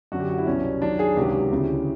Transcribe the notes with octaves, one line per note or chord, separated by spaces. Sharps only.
F#2 D3 F#3 F#4
G4
F#4
E4
C2 B2 F#3 C#4
F#2 D#3 F#3 D4
G#4
C#2 C3 D#3 F#3 G4
D2 C#3 E3